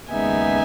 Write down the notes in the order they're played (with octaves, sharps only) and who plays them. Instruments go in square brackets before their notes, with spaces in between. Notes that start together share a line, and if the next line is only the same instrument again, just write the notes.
[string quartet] D#2 C#3 G#3 B3 D#4 E5 G#5